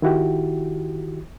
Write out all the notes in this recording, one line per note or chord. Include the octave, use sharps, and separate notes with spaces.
D#3 E4 F#4 G4